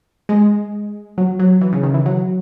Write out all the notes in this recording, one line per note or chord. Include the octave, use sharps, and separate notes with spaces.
G#3
F#3
F#3
E3
C#3
D#3
E3
F#3